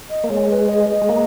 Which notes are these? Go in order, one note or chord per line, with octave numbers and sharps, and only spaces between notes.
D#5
A#3
G#3 C#5
B4
D#5
D#5
G#3
A#3